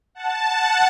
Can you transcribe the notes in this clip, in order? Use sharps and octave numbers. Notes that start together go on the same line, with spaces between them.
F#5 A5
F#5 A5